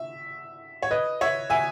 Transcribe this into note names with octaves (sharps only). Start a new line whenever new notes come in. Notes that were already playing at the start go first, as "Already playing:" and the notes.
Already playing: E5
C#5
B4 D#5
C#5 E5
E5 G#5